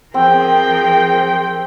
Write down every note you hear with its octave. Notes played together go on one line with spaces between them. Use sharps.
F3 C4 G#4 A#4 G5